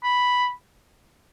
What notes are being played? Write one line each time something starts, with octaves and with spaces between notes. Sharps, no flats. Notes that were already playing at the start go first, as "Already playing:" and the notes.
B5